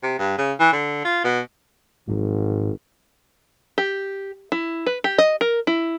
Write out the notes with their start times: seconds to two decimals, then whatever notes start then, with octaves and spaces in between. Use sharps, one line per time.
0.03 C3
0.19 G2
0.38 C#3
0.60 E3
0.73 D3
1.05 F4
1.24 B2
2.08 G#1 G#2 F3 F#3
3.78 G4
4.52 E4
4.86 B4
5.04 G4
5.18 D#5
5.41 A#4
5.67 E4